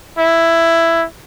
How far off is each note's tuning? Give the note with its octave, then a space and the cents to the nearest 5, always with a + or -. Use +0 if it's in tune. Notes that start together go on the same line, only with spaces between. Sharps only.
E4 +10